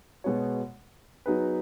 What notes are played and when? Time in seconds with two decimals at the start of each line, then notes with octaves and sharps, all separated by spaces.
0.24 B2 G#3 B3 F#4 C#5
1.26 F#3 B3 D#4 G#4 B4